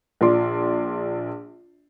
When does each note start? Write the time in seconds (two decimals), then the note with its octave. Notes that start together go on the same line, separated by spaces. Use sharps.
0.21 A#1 F3 D5 C6 D6